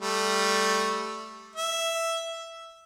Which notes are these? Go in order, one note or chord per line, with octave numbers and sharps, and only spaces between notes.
G3 A3
E5